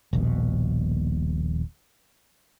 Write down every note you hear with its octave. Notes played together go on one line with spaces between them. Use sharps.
D#1 A#1 B2